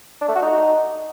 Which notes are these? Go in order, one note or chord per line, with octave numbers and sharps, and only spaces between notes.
D4
A3
F#4
D#4